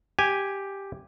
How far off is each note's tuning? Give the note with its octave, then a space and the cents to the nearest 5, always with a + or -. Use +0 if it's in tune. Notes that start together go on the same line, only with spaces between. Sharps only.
G4 +0 G#5 -10